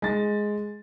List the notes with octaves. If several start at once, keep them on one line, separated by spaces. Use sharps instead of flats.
G#3 A6